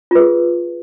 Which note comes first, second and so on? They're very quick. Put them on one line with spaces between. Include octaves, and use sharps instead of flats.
F4 B4 G#4